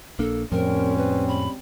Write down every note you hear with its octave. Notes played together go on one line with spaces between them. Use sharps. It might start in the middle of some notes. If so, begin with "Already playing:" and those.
A#1 A#3 D4 A4
F2 A2 F3 G3 G#3 C4 C#4 A#4
B4
B5